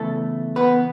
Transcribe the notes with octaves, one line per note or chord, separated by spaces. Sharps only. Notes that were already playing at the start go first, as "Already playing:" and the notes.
Already playing: E2 C#3 E3 A3 A4
B3 B4